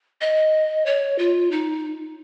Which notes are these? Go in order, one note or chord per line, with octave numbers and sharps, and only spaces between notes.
D#5
C#5
F4
D#4